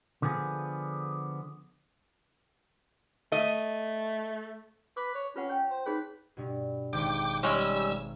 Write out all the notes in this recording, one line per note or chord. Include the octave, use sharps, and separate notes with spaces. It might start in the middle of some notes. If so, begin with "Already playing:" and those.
D3 F3 B3 G#4
A3 D#5
B4 D6
C#5
C#4 F4 B4 F#5
C#5 G5
C5
D#4 G#4 B4 C#5
G2 B2
G#1 G5 D6
G3 G#3 C#4 E6 F6 D7